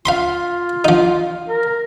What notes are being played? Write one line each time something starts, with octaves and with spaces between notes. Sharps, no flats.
F4 F5 B5 C6
F3 D#4
A#4